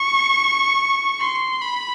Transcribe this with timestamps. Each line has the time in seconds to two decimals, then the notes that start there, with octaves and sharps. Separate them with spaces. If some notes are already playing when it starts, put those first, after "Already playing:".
Already playing: C#6
1.20 C6
1.62 B5